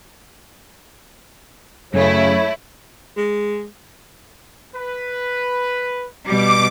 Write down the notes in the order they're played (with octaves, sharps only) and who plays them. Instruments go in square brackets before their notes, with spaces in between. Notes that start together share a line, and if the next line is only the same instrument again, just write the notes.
[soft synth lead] F#2 [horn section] C#3 [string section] A3 E4 [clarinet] C#5
[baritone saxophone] G#3
[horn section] B4
[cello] B2 G3 [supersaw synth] D6